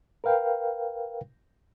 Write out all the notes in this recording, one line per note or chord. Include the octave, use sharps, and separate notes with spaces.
A#4 B4 F5 G5